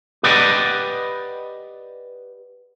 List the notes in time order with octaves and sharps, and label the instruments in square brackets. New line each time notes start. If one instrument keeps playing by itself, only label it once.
[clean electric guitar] G4 B4 D5 D#5 F#5 G5